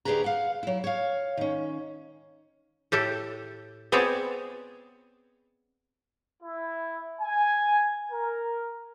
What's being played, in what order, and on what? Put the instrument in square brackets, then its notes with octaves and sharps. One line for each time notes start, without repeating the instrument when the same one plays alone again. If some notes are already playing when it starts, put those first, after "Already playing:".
[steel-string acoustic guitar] D2 G4 G#4 A#4 B4 A#5
F5 F#5
F#3 E4
C#5 F5
D#3 C#4
[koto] A2 G4 A4 E5
B3 C4 G#4 C#5 D5 E5
[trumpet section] E4
G#5
A#4